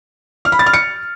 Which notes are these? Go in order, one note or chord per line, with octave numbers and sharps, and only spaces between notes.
F6
B5
A6
F6
C#7